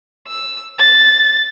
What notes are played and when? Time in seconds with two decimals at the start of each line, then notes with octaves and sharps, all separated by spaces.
0.27 E6
0.78 A6